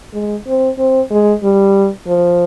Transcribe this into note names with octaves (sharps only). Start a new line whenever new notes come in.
G#3
C4
C4
G#3
G3
F3